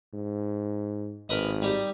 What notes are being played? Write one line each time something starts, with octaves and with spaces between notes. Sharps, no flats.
G#2
G#1 A#4 B4 D#5
G3 D#4 G4